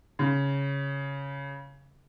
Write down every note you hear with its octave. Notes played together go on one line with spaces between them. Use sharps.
C#3